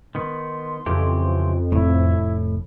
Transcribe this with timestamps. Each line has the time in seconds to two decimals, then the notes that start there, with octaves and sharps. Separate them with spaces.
0.15 D#3 B3 C6
0.86 F2 C#3 E3 G4
1.72 F1 A2 E4